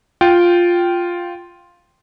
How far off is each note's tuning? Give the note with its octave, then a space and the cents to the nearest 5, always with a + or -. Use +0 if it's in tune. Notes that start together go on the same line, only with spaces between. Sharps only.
F4 +0 G5 -10